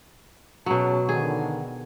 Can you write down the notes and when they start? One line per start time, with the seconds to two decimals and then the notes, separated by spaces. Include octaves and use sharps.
0.66 B2 F#3 C#4 G#4 A5
1.09 D3 D#3 G#4